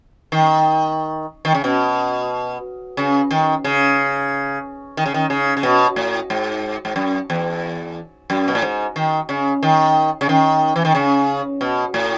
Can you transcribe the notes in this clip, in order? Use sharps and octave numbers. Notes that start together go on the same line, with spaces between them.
D#3
D#3
C#3
B2
C#3
D#3
C#3
D#3
C#3
D#3
C#3
C#3
B2
A2
G#2
G#2
F#2
E2
F#2
B2
A2
G#2
D#3
C#3
D#3
C#3
D#3
E3
D#3
C#3
B2
A2